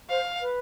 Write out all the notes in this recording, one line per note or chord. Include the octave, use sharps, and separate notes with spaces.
C5 F5
B4